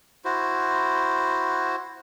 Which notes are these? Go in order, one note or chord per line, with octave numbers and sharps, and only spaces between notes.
E4 F#4 C5